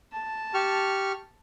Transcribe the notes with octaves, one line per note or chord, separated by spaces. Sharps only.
A5
G4 C#6 F6